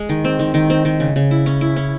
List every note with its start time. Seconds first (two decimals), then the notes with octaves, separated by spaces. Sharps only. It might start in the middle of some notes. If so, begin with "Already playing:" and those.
Already playing: G#3
0.09 D#3
0.24 C4
0.39 D#3
0.54 D#3
0.70 C4
0.85 D#3
1.00 C#3
1.16 C#3
1.31 E4
1.46 C#4
1.61 E4
1.76 C#4